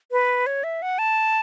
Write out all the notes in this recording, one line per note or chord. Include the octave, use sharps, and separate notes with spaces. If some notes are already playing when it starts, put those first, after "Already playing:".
B4
C#5
E5
F#5
A5